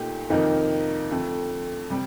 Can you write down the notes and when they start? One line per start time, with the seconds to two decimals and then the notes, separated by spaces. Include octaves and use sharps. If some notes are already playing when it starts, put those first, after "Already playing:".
Already playing: A#2 A3 D#4 G4
0.30 F2 C3 D#3 A#3 D#4
1.11 F2 D3 A3
1.90 C3 G3